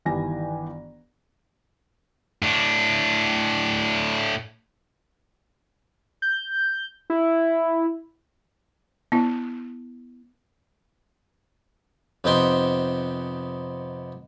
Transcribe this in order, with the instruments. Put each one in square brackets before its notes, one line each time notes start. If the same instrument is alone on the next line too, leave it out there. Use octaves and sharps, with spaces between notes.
[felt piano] G1 D#3 E3 G4 G#5 A#6
[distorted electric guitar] A2 D4
[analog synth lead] G6
E4
[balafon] B3 E4
[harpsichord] F2 C3 B3 D#4 G5 C6